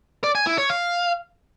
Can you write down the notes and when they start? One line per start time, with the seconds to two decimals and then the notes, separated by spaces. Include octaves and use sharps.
0.24 D5
0.35 G#5
0.47 E4
0.58 C#5
0.70 F5